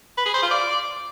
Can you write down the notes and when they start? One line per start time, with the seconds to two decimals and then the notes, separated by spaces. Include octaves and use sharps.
0.17 B4
0.26 G#4
0.34 C5
0.42 F4
0.51 D5